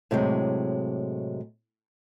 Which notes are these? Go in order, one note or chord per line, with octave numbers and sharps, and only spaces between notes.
A2 C3 F#3 G#3